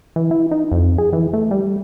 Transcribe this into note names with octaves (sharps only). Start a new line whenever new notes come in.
E3
E4
D#4
F2
G#4
E3
A3
G3